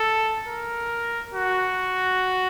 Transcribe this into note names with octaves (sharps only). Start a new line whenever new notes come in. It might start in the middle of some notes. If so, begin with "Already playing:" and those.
Already playing: A4
A#4
F#4